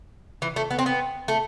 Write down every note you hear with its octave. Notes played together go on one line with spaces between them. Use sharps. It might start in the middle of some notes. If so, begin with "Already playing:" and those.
E3
A3
B3
C4
B3
A3